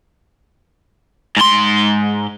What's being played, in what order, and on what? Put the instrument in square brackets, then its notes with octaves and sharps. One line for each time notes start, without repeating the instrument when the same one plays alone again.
[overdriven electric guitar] G#2 C6